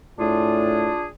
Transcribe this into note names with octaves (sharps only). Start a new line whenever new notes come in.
A2 D4 F4 G#4